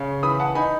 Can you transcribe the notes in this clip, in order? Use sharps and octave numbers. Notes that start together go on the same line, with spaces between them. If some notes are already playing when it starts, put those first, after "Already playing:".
Already playing: C#3
E3 B5 D#6
F#5 A5
D#4 G#5 B5